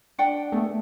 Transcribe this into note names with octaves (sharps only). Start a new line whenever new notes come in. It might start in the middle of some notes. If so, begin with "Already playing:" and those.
D4 F#5 G5
A3 B3 G#4